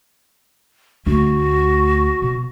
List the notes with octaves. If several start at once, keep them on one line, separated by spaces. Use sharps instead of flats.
D2 A3 F#4
B2